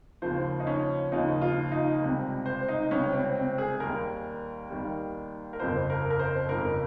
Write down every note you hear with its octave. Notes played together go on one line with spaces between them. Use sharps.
D#2 C#3 F3 C5
D#4
C#4
D#2 C#3 F3 D#4
F4
D#4
C#2 C3 G3
C5
D#4
C#2 C3 G3 C#4
C4
C4
G#4
D#2 D#3 G3 A#4
D#2 D#3 G3
A#4
G1 F2 C#3 C5
A#4
A#4
C5
G1 F2 C#3 A#4